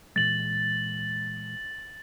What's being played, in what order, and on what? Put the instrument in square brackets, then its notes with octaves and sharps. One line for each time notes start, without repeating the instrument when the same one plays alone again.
[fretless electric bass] A#2 E3 G#3 [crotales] A6 F#7